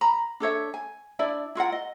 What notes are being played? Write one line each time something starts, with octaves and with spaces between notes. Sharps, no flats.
A#5 B5
D4 A4 C#5 E5
G#5
D4 E4 D5
E4 F4 A#4 F#5
D#5